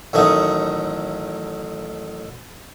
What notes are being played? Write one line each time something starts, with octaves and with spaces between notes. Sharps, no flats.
A1 D#3 F#3 A3 C#6 D#6